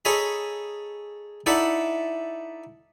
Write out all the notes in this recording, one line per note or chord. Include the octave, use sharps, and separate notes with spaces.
G#4 A4 C#5 D#5 A#5 B5
D#4 E4 A4 D5 E5 F#5